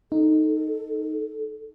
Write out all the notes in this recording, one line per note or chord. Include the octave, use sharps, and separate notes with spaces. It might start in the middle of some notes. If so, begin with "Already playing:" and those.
D#4 A4